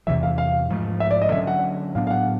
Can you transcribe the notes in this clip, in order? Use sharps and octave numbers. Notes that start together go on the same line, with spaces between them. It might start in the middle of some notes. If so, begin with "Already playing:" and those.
E2 C3 E3 G3 E5
F5
F5
G#2 F3 A3
E5
D5
D#5
D3 F#3 A3 C#4 E5
F#5
A2 F#3 B3 D4 F5
F5
F#5